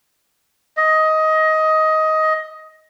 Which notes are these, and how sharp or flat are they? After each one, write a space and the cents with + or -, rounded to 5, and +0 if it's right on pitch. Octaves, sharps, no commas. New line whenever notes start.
D#5 +15